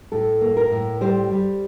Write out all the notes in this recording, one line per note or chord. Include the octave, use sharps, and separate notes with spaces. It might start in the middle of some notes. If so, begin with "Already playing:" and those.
A2 A4
A#3
A#4
A2
G3 C5
G3